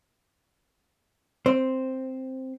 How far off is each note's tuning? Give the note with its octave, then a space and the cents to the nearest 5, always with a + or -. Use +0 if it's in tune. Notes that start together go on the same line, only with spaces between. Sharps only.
C4 +0 C5 +0